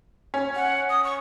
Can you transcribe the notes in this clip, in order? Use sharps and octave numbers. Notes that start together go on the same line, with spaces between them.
C#4
F#5
D#6
C#6